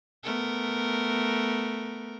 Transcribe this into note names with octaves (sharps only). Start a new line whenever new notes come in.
A3 B3 A#4